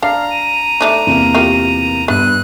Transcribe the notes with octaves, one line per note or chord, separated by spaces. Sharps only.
D4 F5 A5 A#5 F6
D#7
A3 D4 D#4
E2 C3 A#3
F4 G4 A#4
G2 B3 F#6